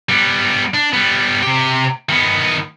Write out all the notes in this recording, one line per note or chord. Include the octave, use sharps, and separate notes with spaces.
G3 B3
D4
G3 B3
C3 G4
D#3 B3